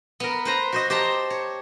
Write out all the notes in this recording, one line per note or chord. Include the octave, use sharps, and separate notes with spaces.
B3 A#4
B4 C5 A#5
F#4 C5 D#5
G4 C5 A5 A#5
C#5